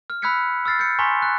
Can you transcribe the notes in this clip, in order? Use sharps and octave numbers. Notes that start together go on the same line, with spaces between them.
F6
B5 E6 F#6 G#6 B6 C#7
E6 F6 A6 C7
G6 C#7
G#5 A#5 C6 C#6 B6
F#6